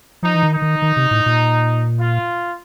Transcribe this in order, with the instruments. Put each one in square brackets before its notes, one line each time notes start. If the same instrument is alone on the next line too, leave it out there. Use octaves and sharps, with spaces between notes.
[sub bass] F3 [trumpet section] D#4
[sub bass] E3
D#3
[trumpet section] D#4
[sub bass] D#3
D#3
C3
A2
A#2
[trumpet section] F4